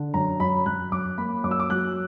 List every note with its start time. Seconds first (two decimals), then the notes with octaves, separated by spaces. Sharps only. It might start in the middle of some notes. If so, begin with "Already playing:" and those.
Already playing: D3
0.14 F#2 A#5
0.40 F#2 B5
0.66 F#2 F#6
0.92 F#2 D6
1.18 A#3 B5
1.44 F#2 D6
1.51 E6
1.60 D6
1.70 F#3 F#6